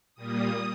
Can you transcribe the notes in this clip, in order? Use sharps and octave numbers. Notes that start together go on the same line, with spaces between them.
A#2 G3 A#3 D#6